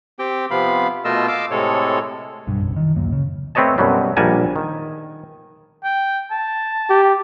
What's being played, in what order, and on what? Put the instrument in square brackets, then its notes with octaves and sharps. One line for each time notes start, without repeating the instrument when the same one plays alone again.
[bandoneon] C4 G4 G5
C3 F3 B3 F5 B5
B2 A3 F4 A#4 D#5 E6
D#5 F5 D6 E6
A2 C3 G#3 A4 C#5
[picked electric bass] B1 G2
F#1 B1
D#3 E3
D1 F#2 A#3
C#3
[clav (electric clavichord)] A3 C4 B4 C#5 D#5 A5
F#2 B2 F#3 G3
A#1 G3 A#4 F#5 G#5 A5
D#3
[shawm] G5
A5
[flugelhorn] G4